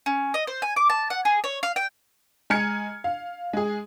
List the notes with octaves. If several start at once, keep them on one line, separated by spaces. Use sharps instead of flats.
C#4
D#5
C5
G#5
D6
A5
F#5
G#4
C#5
F5
G5
G#3 G#5 A#5 F6 G#6 C#7
F5
G#3 G#4